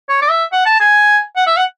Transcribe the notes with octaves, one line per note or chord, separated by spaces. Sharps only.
C#5
D5
E5
F#5
A5
G#5
F#5
E5
F#5